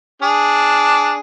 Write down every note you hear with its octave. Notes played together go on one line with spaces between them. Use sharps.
D4 G#4